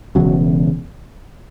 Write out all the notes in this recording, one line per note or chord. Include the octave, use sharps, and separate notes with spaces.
E1 E2 C#3 F#3